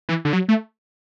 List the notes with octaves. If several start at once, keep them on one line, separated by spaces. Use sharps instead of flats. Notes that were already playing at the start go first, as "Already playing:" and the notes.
E3
D3
F#3
A3